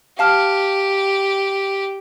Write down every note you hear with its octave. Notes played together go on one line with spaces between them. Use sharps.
G4 F5 A5 F6